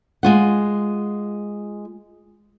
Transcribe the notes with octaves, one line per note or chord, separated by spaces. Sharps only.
G#3 F4 F#5